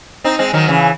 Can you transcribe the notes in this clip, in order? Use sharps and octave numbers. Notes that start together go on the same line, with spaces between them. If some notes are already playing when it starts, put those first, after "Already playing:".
C4 D#4
G#3 C4
D#3 F#3
C#3 E3